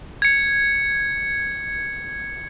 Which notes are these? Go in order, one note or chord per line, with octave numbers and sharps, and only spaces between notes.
G#6 C#7